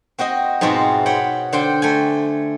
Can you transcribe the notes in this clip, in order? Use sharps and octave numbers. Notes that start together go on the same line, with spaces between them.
C4 F#4 C5 D#5
G#2 B2 G#3 C4 F4 F#4
B4 C#5 F#5 G5
D3 C5 G5
A3 G5 G#5